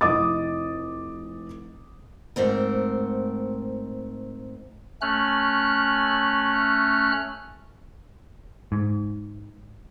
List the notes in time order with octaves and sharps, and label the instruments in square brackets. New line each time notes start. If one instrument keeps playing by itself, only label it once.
[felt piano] F1 E4 D#5 D6 D#6 A6
[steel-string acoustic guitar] G#2 A3 C4 A#4
[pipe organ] A3 C#4 F6 F#6
[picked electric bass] G#2